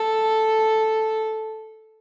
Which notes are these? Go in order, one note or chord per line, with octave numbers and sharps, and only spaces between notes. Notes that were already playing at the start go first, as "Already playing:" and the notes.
Already playing: A4